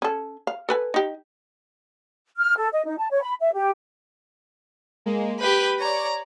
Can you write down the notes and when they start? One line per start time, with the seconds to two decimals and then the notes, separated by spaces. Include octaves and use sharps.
0.02 C#4 A4
0.47 F5
0.69 A4 B4 G#5
0.94 D#4 G4
2.37 F6
2.57 A4
2.72 D#5
2.85 D#4
2.98 A5
3.11 C#5
3.22 B5
3.40 E5
3.53 G4
5.06 G#3 A#3
5.40 G4 B4 G6 B6 D#7
5.80 C#5 D5 A#5